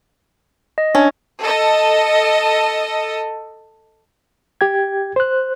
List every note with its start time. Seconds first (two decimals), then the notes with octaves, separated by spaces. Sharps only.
0.78 D#5
0.95 C#4 D4
1.41 A4 D#5
4.61 G4 G5 G#6
5.16 C5 F#6